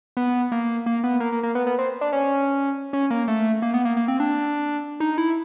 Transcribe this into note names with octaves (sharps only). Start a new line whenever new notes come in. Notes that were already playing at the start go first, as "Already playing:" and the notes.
B3
A#3
A#3
B3
A#3
A#3
A#3
B3
B3
C4
D4
C#4
C#4
A#3
A3
A#3
B3
A#3
A#3
C4
D4
D#4
E4